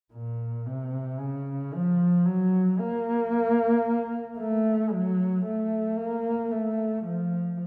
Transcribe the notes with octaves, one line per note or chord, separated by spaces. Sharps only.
A#2
C3
C#3
F3
F#3
A#3
A3
F#3
A3
A#3
A3
F3